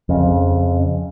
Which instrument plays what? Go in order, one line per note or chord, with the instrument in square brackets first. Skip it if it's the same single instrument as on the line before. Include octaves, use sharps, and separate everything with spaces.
[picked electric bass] F2 C#3